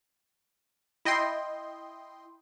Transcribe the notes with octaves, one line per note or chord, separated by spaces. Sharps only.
E4 D#5 G5 C6